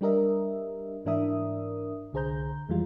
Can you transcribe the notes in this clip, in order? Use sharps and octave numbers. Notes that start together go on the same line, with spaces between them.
G3 D4 G4 A#4 D#5 E5
G#2 E3 D4 A#4 E5 D#6
C2 D3 G#4 C5 A#5 G6
F2 E3 F3 G3 G#3 F4